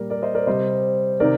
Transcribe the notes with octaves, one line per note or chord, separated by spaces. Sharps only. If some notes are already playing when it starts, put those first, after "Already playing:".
Already playing: A#2 G3 A#4 D5
A#4 D5
C5 D#5
A#4 D5
C3 G3 C5 D#5
C3 D#3 A#4 D5